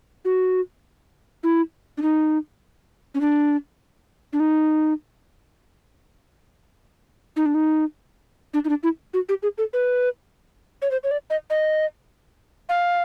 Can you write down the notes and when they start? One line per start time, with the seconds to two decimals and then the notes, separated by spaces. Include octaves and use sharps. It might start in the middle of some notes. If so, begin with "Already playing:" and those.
0.25 F#4
1.43 E4
1.97 D4
2.02 D#4
3.14 C#4
3.21 D4
4.33 D4
4.40 D#4
7.36 D#4
7.46 D4
7.54 D#4
8.54 D4
8.65 D#4
8.69 D4
8.83 E4
9.14 F#4
9.29 G4
9.43 G#4
9.58 A4
9.73 B4
10.82 C#5
10.91 C5
11.04 C#5
11.11 D5
11.30 D#5
11.50 D#5
12.69 F5